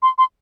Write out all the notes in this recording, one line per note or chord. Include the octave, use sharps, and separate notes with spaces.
C6
C6